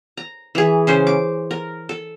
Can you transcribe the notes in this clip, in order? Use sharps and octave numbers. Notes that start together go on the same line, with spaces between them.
A#5
E3 G#4
C#3 C#4 C5
D6
A#4
A4